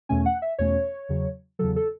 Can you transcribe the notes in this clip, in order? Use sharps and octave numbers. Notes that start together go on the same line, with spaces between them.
E2 B2 A3 C#4 G#5
F#5
E5
E2 B2 A3 C#4 C#5
E2 C#3 F#3
E2 C#3 F#3 A4
A4